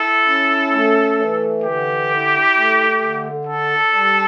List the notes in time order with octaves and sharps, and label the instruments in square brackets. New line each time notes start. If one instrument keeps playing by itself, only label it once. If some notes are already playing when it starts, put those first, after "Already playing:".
Already playing: [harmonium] E4 [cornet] A4
[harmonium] C#4
A3
E3
[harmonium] D3 [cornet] G4
[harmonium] E4
A3
D3
[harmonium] D4 [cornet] A4
[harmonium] G3